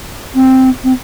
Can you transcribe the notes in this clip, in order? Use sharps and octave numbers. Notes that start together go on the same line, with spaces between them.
C4
C4